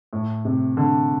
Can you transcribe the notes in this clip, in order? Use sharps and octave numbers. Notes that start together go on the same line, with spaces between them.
A2
C3
D3